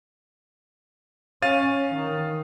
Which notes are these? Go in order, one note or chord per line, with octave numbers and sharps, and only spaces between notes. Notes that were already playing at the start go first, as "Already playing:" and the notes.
C#4 F5 A6 D#7
D#3